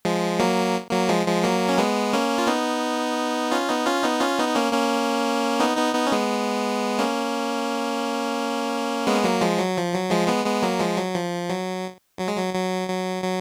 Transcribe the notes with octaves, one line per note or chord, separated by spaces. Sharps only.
F3 G#3
F#3 A#3
F#3 A#3
F3 G#3
F3 G#3
F#3 A#3
C#4
G#3 B3
A#3 C#4
F4
B3 D#4
C#4 F4
B3 D#4
C#4 F4
B3 D#4
C#4 F4
B3 D#4
D#4
A#3 C#4
A#3 C#4
B3 D#4
B3 D#4
B3 D#4
C#4
G#3 B3
A#3 C#4
G#3 B3
F#3 A#3
F3 G#3
F#3
F3
F#3
F3 G#3
G#3 B3
G#3 B3
F#3 A#3
F3 G#3
F#3
F3
F#3
F#3
G#3
F#3
F#3
F#3
F#3